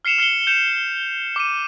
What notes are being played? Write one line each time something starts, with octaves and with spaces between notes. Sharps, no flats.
F6 C7 C#7 E7 F7
F6 C7 C#7 G7
G6 C#7 E7 F7
D6 C#7 D#7